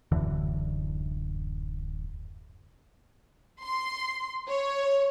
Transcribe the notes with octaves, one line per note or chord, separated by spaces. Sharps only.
D1 F#2 D3 E3
C6
C#5